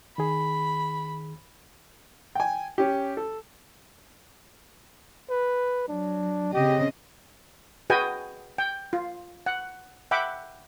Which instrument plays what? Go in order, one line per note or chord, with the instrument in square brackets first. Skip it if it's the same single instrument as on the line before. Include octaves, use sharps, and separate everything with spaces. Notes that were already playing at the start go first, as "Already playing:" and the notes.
[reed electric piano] D#3 G#4 [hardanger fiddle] B5
[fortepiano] G5 G#5
C#4 G4
A4
[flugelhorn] B4
[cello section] F#3 [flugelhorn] D4
[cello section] C#3 C4 D#5 [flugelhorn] G4
[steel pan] F#4 G#4 B4 D#5 G5 G#5
G5
F4
F#5
E5 F#5 G5 B5 D6